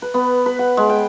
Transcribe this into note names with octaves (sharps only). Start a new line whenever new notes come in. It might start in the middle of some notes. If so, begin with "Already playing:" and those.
B4
B3
B4
F#5
G#3
G5